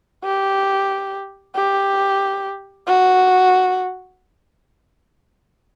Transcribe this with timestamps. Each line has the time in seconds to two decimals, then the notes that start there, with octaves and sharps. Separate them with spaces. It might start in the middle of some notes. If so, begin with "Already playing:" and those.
0.25 G4
1.56 G4
2.88 F#4